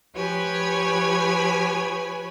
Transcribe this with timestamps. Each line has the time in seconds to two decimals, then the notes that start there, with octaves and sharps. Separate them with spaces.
0.14 F3 G4 B4 C#5 G#5 B5